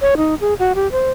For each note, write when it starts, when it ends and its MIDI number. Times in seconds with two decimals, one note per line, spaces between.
0.01 0.15 73
0.17 0.35 63
0.41 0.54 68
0.59 0.73 66
0.75 0.90 67
0.92 1.11 72